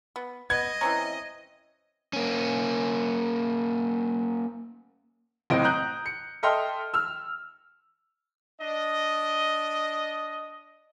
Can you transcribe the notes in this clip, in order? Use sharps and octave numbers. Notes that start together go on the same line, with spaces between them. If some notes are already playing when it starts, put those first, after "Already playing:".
B3
B3 D#5 G#6
E3 C4 C#4 A#5
A#3 C#4
F#1 A2 C4 D#5 D7
A#5 D#6 F#6 G6
C#7
A4 D#5 E5 G5 C6 F6
E6 F6
D4 D#5